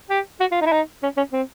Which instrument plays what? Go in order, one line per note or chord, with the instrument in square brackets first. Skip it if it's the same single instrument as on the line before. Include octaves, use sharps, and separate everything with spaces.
[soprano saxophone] G4
F#4
F4
D#4
E4
D#4
C#4
C#4
C4